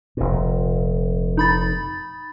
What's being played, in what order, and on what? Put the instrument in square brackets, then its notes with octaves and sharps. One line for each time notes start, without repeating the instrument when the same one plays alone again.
[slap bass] F1 A#2
[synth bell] D#4 B5 A6